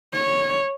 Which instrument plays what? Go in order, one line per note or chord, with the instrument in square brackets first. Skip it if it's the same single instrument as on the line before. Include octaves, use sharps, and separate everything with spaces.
[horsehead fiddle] C#5